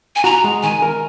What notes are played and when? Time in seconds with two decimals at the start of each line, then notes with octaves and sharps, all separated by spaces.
0.16 G#5
0.24 F#4 A#5
0.44 G#3
0.63 D#3 G#5
0.82 A#4